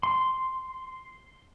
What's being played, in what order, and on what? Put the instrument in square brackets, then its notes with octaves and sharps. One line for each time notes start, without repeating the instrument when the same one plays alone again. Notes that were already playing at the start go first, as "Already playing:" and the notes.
[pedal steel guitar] C6